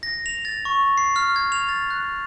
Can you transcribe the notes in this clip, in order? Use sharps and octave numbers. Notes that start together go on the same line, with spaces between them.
A#6
F7
A6
C#6
C7
F6
G#6
F7
A6
F#6